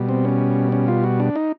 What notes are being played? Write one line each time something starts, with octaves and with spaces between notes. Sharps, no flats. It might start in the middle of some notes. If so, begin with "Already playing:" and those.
Already playing: B2 G3
C4
C#4
C#4
F4
F#4
D4
D#4